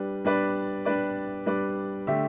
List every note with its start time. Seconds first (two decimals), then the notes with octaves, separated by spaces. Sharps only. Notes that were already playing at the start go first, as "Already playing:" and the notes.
Already playing: G3 D4 B4
0.25 G3 D4 B4 D5
0.85 G3 D4 B4 D5
1.46 G3 D4 B4 D5
2.07 D3 A3 G4 E5